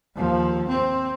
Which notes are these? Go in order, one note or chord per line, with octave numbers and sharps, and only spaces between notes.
D#2 F3
C4